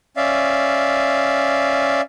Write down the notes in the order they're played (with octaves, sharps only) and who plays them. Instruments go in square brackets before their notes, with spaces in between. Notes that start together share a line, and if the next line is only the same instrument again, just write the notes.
[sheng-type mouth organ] C#4 D5 E5 F5